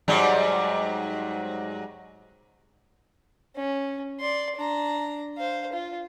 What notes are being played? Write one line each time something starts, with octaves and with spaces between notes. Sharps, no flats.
G#2 F#3 G3
C#4
D5 C6
D4 A#5
C5 F5
F4